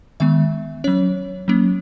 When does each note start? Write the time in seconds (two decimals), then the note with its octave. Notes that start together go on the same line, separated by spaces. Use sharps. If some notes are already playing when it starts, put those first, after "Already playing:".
0.20 D#3 G#3 B3 E5
0.84 F#3 C#4 C#5
1.48 F#3 A#3 C#4